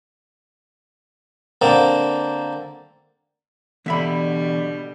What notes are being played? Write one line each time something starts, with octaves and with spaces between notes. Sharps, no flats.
D3 A#3 C4
B2 D3 E3 G3 B3 D4 E5 B5